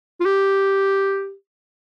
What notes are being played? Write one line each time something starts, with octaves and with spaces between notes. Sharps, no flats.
F4
G4